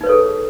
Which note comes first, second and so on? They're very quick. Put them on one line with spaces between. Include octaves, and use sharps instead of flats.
D#4 B4 C#5 A4 G#4